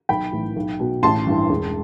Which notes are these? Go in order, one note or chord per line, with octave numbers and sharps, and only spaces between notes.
B1 G5 B5
A2 E3
B1
B2
A1 A5 C6
G2 E3
E1